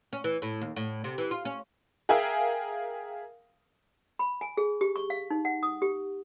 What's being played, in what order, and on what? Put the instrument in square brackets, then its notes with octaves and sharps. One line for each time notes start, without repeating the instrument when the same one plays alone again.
[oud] C#4
E3
A2
D#2
A2
C3
E3
F4
C#4
[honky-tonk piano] G#4 A#4 E5 F5 G5 G#5
[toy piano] B5
G#5
G#4
G4
C#6
F5
D#4
F#5
D#6
G4